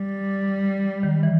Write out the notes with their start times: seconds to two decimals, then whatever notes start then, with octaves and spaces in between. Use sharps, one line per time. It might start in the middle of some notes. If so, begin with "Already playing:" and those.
Already playing: G3
1.03 D#3
1.23 E3